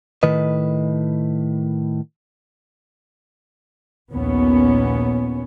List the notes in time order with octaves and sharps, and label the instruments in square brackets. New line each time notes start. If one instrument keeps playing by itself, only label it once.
[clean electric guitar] A2 D#3 B4 D#5
[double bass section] A#1 D#2 B3 C#4